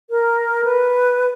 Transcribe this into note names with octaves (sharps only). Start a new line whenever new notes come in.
A#4
B4